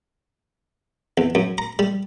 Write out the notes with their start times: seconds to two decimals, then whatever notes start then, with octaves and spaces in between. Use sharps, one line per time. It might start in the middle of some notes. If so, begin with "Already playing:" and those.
1.18 E2
1.35 F#2
1.58 A#5
1.79 G3